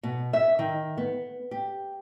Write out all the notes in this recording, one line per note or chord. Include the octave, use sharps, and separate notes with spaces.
B2
E5
D#3
B3
G4